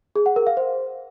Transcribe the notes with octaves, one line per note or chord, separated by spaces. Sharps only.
G#4
F#5
A#4
F5
C5